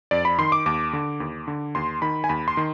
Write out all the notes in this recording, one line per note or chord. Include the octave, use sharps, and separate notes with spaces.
F2 D5
B5
D#3 C6
D6
D#2 D6
D3
D#2
D3
D#2 C6
D#3 B5
G#5
D#2 B5
C6
D#3